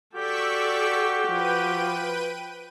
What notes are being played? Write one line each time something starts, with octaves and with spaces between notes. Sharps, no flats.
F#4 G4 A4 D5 C#6 E6 B6
F3 B4 G5 D#7